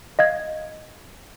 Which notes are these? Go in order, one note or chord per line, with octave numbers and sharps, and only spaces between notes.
D#5 F5 G#6